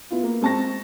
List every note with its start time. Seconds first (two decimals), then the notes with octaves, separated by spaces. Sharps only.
0.11 B3 E4 F4
0.23 A#3
0.42 G#3 C4 A5 C#6 A#6